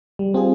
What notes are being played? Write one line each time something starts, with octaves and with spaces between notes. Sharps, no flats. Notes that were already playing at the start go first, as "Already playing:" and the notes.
G3
C4 F4 G#4